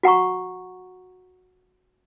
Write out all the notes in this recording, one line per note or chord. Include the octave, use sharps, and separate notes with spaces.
F#4 F#5 A#5 C#6